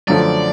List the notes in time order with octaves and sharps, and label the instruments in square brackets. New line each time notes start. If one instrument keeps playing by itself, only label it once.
[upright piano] F#2 D3 F3 A3 [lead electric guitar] D5